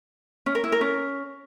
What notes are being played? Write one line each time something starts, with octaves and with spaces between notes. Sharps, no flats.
C#4
A#4
E4
A#4
C#4